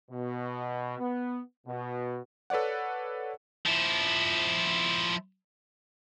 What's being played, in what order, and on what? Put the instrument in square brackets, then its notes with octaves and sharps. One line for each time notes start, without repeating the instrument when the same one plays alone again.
[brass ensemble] B2
B3
B2
[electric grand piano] A4 B4 C#5 D5 F#5
[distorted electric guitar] F3 E4